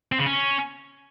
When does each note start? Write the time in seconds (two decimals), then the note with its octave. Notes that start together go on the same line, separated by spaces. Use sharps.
0.12 C4
0.19 C#3
0.26 C#4